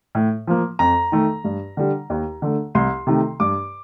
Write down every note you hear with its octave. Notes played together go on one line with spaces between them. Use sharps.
A2
F3 A#3
F2 A#5
D#3 A3
G2
D3 G3
D#2
D3 A3
C2 C6
C3 D#3 A3
G2 D6